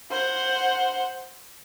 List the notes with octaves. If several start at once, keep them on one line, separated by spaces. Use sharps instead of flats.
C5 F#5